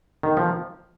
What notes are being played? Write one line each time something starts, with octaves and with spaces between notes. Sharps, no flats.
D#3
F3